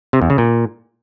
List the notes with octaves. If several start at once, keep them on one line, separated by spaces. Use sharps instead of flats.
C3
E2
C#3
A#2